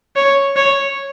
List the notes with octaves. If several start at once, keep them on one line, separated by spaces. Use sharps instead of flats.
C#5
C#5